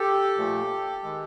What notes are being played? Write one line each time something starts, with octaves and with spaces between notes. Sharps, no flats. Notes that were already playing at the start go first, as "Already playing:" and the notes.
Already playing: G4 A4
A#2 F3 A3
D#3 G#3